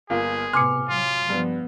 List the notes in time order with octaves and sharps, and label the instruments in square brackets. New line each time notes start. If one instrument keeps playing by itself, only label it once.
[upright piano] G1 A#3 F4 [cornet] G#4
[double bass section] A2 C3 B3 [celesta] G#5 D6 C#7 [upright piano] C6 F6
[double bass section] F#3 [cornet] F4
[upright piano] G2 [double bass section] F3 B3